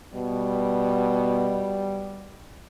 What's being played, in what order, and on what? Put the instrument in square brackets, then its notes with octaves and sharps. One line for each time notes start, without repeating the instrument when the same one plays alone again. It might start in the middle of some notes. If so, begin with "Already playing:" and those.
[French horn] B2 [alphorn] G3